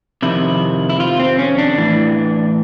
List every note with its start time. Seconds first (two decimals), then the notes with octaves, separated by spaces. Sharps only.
0.22 F2 C3 D#3 E4
0.89 E4
1.00 F4
1.20 C4
1.39 C#4
1.58 D4
1.78 A2 E3